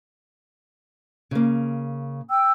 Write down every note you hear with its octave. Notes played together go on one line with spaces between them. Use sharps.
C#3 A#3
G5 E6